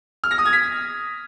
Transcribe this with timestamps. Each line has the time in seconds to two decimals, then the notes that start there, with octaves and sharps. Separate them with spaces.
0.24 F6
0.31 A#6
0.38 D#6
0.46 G#6
0.53 B6